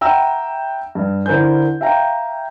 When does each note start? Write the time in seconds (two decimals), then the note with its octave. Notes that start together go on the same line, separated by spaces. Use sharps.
0.01 E5 F#5 G5 A#5 B5 E6
0.95 G2
1.26 D3 E4 A#4 C5 G#5 G6
1.81 E5 F5 G5 A#5